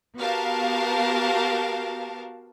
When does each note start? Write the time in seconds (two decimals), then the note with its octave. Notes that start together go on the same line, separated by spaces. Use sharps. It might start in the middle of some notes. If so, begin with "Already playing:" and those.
0.17 B3 F#4 G4 A#4 F5 A5